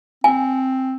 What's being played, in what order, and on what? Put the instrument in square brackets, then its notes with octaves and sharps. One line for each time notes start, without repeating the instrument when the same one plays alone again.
[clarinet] C4 [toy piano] G#5